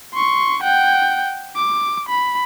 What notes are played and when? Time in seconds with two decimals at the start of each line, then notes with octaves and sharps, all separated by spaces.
0.14 C6 C#6
0.63 F#5 G5
1.56 D6
2.09 B5